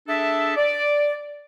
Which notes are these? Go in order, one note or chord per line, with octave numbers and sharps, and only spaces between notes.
D4 G#4 A4 E5
D5